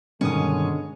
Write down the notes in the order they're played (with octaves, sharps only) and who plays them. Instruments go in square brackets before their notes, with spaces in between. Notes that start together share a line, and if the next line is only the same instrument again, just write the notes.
[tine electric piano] G2 D#3 D#6 [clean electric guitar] B2 [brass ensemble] D3 G#3 [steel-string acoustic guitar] C#4